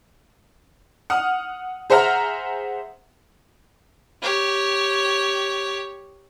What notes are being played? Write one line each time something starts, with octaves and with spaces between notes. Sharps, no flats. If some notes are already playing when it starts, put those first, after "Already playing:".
F#5 D#6 F6
G#4 C5 E5 F#5 A#5 F6
G4 C#5